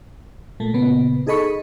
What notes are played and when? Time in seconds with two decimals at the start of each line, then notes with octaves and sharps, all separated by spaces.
0.60 A#2 A3
0.74 A#2 C#3 B3
1.27 D#4 G#4 A4 D#5 B5 C#6